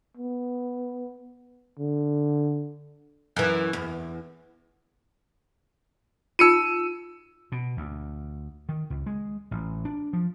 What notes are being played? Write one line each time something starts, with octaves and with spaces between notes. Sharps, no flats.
B3
D3
F#2 E3
E2
D#4 F4 E6 C#7 D#7
B2
D2
D#3
C#2
G#3
A1
D4
F3